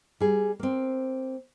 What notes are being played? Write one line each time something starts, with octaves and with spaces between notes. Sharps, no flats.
G3 G#4
A#3 C4